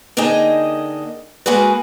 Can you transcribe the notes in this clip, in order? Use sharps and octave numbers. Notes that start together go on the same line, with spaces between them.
D3 A#3 D#4 G#4 D#5 G5
G#3 A#3 F#4 G#4 B4